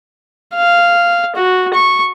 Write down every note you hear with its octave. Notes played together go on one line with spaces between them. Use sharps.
F5
F#4
C#6